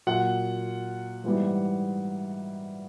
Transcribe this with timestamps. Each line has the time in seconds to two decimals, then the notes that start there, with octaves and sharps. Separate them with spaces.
0.07 A#2 F#3 F#5
1.24 G#2 E3 G3